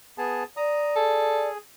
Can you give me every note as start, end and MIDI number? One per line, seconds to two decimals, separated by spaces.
0.18 0.44 59
0.18 0.44 68
0.18 0.44 81
0.57 1.48 74
0.57 0.95 82
0.57 0.95 87
0.96 1.58 68
0.96 1.53 69